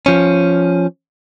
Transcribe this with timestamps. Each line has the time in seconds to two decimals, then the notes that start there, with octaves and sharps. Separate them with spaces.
0.06 F3 C#4